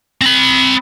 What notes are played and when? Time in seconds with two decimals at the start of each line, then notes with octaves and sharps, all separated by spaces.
0.21 C4 B5